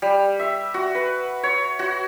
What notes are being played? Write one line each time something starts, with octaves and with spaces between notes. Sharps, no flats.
G3
E5
F#4
B4
C#5
F#4